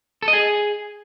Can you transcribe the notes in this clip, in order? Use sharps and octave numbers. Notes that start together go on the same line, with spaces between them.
A4
D#5
G#4